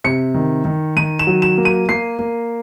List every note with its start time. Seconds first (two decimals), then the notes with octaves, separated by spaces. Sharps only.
0.04 C3 C#7
0.34 D#3
0.65 D#3
0.96 D#3 D#7
1.19 E7
1.27 F#3
1.42 E7
1.58 A#3
1.65 D#7
1.89 A#3 C7
2.19 A#3